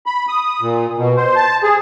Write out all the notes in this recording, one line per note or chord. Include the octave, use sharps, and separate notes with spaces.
B5
D#6
A#2
B2
C5
A5
G#4